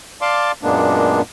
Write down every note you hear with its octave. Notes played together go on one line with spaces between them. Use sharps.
D5 F5 A5 C6 D6
F#2 A#2 G#3 A#3 B3 D4